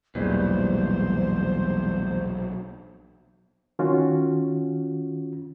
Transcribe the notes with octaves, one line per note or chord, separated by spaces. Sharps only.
B1 E2 A#2 E3 G3 G#3 C5
D#3 C#4 F4 F#4